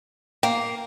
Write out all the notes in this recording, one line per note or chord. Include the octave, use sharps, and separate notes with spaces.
A#3 G5